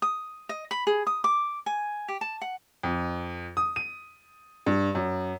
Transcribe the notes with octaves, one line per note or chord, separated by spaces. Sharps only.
D#6
D#5
B5
G#4
D#6
D6
G#5
G4
A5
F#5
F2
D#6
D#7
G2
F#2